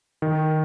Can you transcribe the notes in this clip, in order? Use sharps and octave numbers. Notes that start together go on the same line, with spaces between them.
D#3